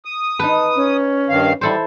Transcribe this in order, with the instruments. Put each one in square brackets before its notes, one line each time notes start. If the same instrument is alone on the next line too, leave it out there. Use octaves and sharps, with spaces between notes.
[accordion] D#6
[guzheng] D#4 B4 [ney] A5
[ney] C#4
[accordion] G2 D#3 F5
[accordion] G3 [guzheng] E4 A4 C5